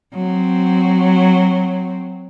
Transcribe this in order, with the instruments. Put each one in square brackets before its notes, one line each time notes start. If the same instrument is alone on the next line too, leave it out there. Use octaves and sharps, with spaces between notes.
[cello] F#3 C4